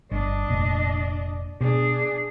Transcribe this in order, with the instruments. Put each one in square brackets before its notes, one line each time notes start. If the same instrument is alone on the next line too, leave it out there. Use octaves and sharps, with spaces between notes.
[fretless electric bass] G1 [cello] D4 D#5
[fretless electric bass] F1 A#2
[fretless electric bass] B2 [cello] D4 G#4